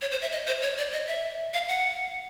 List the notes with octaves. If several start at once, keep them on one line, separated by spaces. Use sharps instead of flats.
C#5
C5
E5
D#5
C5
C#5
D5
D#5
E5
F5
F#5